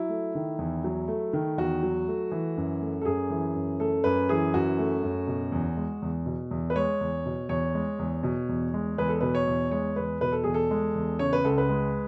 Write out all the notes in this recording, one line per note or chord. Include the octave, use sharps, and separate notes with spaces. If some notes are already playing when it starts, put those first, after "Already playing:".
Already playing: F#3 E4
A3
D#3
E2
F#3
A3
D#3
E2 F#4
F#3
A3
E3
F#2
A3
A4
F#2 G#4
E3
F#2
A3 A4
F#2 B4
E3 G#4
F#2 F#4
A3
F#2
B2
E2
G#3
E2
B2
E2
B4
G#3 C#5
E2
B2
E2 C#5
G#3
E2
B2
E2
G#3
E2 B4
A4
B2 B4
C#5
E2
G#3 C#5
E2 B4
B2 B4
A4
E2 G#4
A4
G#3
E2
C#3 C#5
B4
C#2 A4
B4
G#3